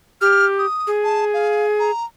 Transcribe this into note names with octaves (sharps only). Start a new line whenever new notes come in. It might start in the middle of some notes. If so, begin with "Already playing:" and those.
G4 F6
D#6
G#4
A5
F5
A#5